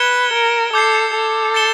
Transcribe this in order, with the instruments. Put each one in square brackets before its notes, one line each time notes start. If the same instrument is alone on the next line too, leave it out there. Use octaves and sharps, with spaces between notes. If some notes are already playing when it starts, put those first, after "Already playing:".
Already playing: [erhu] B4 [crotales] G#6 C#7 E7 G7
[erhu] A#4
[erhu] A4 [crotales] D6 G6 C7
[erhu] A4
[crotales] A6 C#7 E7 G7